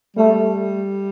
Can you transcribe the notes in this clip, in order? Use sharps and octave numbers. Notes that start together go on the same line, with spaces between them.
G3 A3